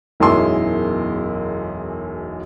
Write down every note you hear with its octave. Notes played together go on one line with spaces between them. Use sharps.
E1 B1 F#2 G#3 E4 C6